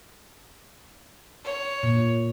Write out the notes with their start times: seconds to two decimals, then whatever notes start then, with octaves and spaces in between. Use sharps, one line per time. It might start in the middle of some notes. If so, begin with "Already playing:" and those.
1.44 C#5
1.83 A#2